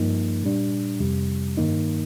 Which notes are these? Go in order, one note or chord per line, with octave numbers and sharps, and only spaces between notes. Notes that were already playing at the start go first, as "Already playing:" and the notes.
Already playing: G2 F3 A#3 D#4
A#2 G3 D4
F2 C3 G3
G2 D#3 A#3 D#4